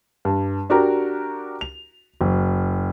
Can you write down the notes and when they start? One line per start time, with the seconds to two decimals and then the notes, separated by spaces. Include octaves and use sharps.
0.25 G2
0.70 D4 F#4 G4 A#4 A#5
1.61 F7
2.21 F#1